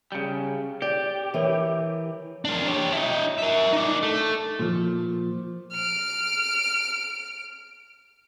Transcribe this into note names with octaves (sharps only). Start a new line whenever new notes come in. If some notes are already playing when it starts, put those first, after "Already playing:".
C#3 G3
G4 D5
E3 A#4 C#5
D4 A#4
G4 C#5
E4 D#5
A#4 E5
D#4 D5
A3
A#2 F3
F6 D7